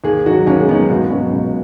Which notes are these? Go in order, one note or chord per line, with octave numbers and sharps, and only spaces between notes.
D#2 G#4
D#3 F#3 F#4
D#2 C#4
G#3
D#3 F#3 B3
C#2 F#4
B3
B2 F#3 C#4
C#2